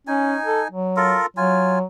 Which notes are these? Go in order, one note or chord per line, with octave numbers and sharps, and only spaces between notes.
C#4 D#4 G#5
A4
F#3
F4 A4 A#4
F#3 F4 G#5